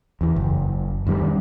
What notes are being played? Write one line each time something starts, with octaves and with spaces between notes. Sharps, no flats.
E2 E3
F#1
F#2 D#3 F3 G3